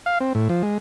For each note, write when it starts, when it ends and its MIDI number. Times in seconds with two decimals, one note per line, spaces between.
0.06 0.19 77
0.20 0.33 60
0.35 0.48 45
0.49 0.63 53
0.63 0.78 56